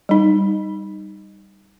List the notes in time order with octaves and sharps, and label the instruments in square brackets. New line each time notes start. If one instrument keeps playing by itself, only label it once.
[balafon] G3 D#4